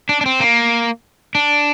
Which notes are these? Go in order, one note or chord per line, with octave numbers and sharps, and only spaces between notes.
D4
D4
C4
A#3
D4